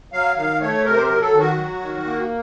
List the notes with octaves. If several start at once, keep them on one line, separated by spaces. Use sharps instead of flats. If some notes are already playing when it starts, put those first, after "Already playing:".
F#3 F5
D#3 F5
A3 C#5
C3 A#4
C5
A#4
F#3
A4
D#3
F#4
F#3
D#3
A#3